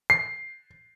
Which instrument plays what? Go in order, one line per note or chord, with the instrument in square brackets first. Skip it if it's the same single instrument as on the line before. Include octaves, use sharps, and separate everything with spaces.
[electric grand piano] C7